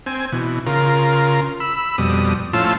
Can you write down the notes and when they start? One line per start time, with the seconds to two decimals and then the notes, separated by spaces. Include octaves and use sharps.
0.06 C4 G#5
0.32 B2 E3
0.66 C#3 F4 A#4
1.60 B5 E6
1.98 F2 B2 G3 D#6
2.53 A2 F3 C#4 F4 A5 E6